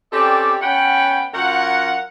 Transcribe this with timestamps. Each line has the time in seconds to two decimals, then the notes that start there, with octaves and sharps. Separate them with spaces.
0.12 C4 C#4 G4 A4 D5
0.62 B3 C#4 F#5 G5
1.34 F#2 F4 A#4 F#5